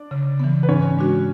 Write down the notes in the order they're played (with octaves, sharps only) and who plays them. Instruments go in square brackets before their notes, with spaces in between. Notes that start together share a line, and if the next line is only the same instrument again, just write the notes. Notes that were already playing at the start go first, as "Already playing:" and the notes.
Already playing: [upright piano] D4 D5
[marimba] C#3
E3 B3
[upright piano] B4
[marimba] G#2 [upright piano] C#4 C#5
[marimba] G#3 D4 F#4